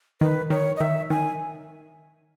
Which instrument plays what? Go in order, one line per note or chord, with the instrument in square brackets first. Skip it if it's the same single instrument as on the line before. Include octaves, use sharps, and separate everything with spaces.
[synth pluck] D#3 [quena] B4
[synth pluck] D#3 [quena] C#5
[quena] D#5
[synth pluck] D#3 [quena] E5
[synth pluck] D#3 [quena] G#5